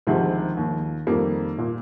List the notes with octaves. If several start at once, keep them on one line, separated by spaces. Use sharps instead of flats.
D2 C3 D#3 F3 G#3
D#2 D#3
F2 D#3 G3 A#3
A#2